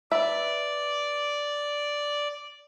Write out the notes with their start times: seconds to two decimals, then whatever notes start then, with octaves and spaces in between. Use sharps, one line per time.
0.11 B4 D5 E5